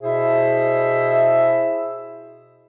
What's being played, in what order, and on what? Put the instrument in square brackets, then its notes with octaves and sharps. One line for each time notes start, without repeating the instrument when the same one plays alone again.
[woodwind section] B2 E4 G#4 C5 E5